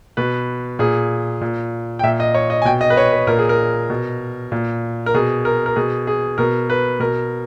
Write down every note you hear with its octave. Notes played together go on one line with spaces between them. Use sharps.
B2 B4
A#2 G#4
A#2
G5
A#2 E5
D#5
C#5
D#5
G#5
B2 G5
D#5
B4
C#5
B4
A#2 A#4
G#4
A#4
B2
A#2
A#4
B2 G#4
A#4
A#4
B2 G#4
G#4
B2 A#4
B4
B2 A#4